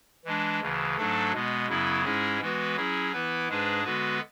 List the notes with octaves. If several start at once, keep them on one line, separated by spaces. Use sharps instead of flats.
E3 G#3 D4
D2 C#3 E3
G#2 F#3 A3 D4 A4
B2 G#3 B3
F#2 C#3 F#3 B3 E4
G#2 G#3 C#4 E4 G#4
E3 G#3 B3 F#4 B4
F#3 C#4 E4 G#4
E3 B3 E4 B4
G#2 G#3 D4 G#4 B4
D3 G#3 B3 F#4 B4